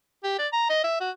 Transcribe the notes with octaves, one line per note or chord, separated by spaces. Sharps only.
G4
D5
A#5
D#5
E5
F#4